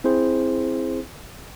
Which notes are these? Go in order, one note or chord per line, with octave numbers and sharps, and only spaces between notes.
C4 E4 G#4 C5